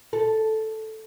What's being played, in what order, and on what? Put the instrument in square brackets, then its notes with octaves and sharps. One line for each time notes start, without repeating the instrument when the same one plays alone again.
[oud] A4